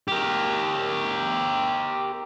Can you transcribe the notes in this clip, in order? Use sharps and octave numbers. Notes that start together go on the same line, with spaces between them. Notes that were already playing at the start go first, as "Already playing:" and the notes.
G4 A#4